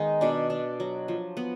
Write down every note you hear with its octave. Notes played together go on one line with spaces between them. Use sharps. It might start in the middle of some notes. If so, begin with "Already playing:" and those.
Already playing: D#3 G#3 B3 D#4
B2 D4
D4
F#3
F3
B3